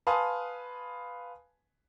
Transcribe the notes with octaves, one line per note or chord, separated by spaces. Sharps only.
B4 F5 G#5 A5 C6 D#6